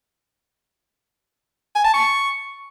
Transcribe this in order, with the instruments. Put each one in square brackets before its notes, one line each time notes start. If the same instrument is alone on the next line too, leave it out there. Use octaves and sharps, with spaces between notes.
[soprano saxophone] G#5
A5
C#6